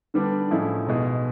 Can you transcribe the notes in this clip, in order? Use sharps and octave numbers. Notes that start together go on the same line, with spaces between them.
D3 G3 B3 D4
A2 F3 G#3 C#4 E4
B1 B2 G#3